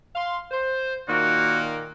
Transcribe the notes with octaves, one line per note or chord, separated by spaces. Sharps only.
F5 C6
C5
A#2 D#3 A#3 F#4